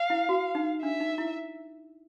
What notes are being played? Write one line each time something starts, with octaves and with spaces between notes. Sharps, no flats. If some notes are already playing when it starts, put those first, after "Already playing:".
Already playing: F5
E4
F#4
D#4
D4 E5
D#4
E4